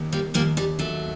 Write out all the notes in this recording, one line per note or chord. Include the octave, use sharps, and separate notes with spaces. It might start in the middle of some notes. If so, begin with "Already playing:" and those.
Already playing: D#2
G3 A#3
D#2 G3 A#3
G3
F#3 A3